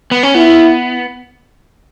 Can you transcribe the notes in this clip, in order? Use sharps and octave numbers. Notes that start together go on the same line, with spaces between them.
B3
C#4
B3 E4